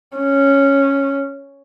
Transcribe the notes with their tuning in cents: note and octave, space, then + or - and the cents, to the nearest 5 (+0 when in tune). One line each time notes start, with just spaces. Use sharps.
C#4 -5